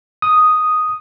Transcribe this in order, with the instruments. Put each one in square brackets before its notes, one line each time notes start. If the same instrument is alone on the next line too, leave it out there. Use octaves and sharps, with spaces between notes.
[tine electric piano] D#6